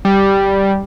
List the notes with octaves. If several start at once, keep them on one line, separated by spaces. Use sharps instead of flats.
G3